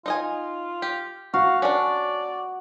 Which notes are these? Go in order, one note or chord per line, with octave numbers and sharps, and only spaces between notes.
D#4 F4 D#5 G#5
G4
F#4 F5
C#4 D4 D5